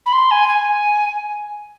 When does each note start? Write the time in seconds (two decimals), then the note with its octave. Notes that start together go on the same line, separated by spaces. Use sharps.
0.06 B5
0.12 C6
0.31 G#5
0.49 G#5